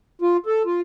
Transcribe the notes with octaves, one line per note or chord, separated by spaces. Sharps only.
F4
A4
F4